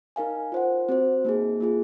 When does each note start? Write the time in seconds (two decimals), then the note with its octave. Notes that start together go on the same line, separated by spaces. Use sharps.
0.16 D#4 A#4 F5 G#5
0.52 F4 C5 F#5
0.89 C4 F#4 C5
1.25 A#3 D#4 G#4
1.60 A#3 F4 G#4